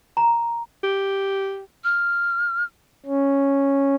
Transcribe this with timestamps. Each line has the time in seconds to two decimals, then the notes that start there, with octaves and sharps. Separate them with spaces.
0.17 A#5
0.84 G4
1.84 F6
3.06 C#4